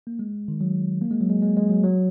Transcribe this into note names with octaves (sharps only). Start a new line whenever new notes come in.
A#3
G#3
D#3
F#3
A#3
G#3
F#3
G#3
G#3
G#3
F#3
F#3